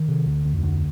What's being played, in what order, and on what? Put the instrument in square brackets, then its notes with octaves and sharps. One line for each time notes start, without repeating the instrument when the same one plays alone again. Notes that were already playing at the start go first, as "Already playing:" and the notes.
Already playing: [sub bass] D#3
[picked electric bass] C3
[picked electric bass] D2 [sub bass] D3
[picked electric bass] D2
[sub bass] F2
[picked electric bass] D3